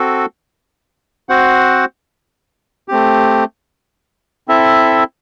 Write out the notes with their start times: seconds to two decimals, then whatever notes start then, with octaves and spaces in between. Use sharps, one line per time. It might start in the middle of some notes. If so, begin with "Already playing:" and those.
Already playing: C4 F#4 A4
1.29 C4 F#4 C5 F#5
2.88 A3 C4 G4
4.48 C4 E4 A4 E5